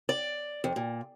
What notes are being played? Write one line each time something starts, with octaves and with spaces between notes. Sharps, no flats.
D5
F2
A#2